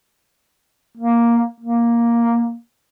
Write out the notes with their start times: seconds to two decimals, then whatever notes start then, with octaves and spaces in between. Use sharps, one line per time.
0.98 A#3
1.60 A#3